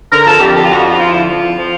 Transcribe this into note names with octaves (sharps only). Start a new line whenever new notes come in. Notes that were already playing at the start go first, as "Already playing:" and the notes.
D3 A#4
F2 A4
F2 G4
D3 G4
F4
F2 F#4
F3 F4
F3 F4
D3 E4
F3 F4
F2
F3